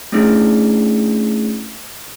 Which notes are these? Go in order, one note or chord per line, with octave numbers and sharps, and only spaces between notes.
A3 C#4 D4 E4 G#4